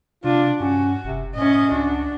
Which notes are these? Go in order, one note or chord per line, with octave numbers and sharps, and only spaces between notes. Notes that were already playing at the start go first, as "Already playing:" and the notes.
C3 D4 F4
G2 C#4 F#4
F1 C3
F#2 A2 C#4 D#5
C#2 D4 F#4